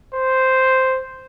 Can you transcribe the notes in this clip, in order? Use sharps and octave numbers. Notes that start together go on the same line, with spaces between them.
C5